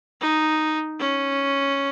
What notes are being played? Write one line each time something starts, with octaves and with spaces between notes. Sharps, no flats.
D#4
C#4